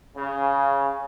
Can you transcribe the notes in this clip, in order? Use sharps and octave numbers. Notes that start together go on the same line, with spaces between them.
C#3